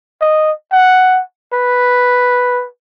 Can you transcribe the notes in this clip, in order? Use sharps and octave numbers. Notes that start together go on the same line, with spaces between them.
D#5
F#5
B4